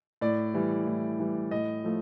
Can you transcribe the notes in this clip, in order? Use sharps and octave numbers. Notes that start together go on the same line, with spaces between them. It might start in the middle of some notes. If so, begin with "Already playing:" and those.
A2 D5
E3 G3
A2
E3 G3
A2 D#5
F3 A3